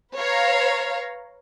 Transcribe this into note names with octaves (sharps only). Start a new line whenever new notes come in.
B4 C#5 F5 A#5